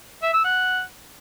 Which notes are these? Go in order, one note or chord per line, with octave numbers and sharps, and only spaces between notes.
E5
E6
F#5